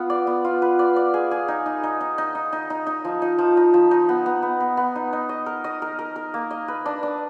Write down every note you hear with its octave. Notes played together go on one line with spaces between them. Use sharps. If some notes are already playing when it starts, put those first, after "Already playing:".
Already playing: B3 F4
D5
B3
F4
B4
D5
D5
G#4
G#4
D#4
D#4
D#4
D#4
D#4
D#4
D#4
D#4
D#4
F3
D#4
F3
D#4
F3
D#4
B3
B3
B3
B3
B3
D#4
D#4
D#5
A#4
D#5
A#4
A#4
A#4
A#3
D#5
B4
D4
D4